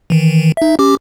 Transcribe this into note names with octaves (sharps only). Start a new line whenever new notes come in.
D#3 E3
D#4 E5
C#4 G4 D6